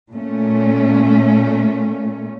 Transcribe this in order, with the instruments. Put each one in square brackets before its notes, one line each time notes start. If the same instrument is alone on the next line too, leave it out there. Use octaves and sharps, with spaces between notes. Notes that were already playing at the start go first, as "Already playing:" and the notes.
[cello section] A#2 A3 C#4